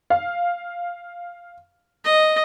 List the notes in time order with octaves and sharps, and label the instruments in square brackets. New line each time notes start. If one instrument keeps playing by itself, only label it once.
[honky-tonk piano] F5
[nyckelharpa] D#5